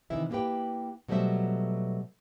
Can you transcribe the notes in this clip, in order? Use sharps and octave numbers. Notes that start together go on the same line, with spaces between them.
C3 D#3 E3 E4 E5
A#3 B3 E4 G4 B4 G5
B2 F#3 G3 A3 C5 E5